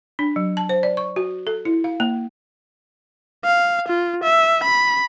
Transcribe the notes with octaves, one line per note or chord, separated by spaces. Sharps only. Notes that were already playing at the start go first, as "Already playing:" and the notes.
D4
F#3
A5
C5
D5
C#6
F#4
A4
E4
F5
A#3
F5
F4
E5
B5